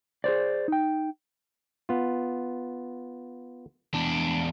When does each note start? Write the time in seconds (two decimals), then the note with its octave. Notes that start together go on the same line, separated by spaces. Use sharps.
0.24 G#4 B4 C5 D5
0.68 D#4 G5
1.89 B3 F4
3.94 E2 D4